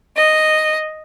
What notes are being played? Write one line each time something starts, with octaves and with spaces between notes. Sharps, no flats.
D#5